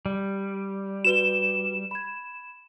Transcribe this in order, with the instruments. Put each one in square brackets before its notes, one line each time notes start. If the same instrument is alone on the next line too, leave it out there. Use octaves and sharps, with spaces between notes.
[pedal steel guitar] G3
[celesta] F#4 B4 G7 [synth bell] E7
[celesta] B5 G#6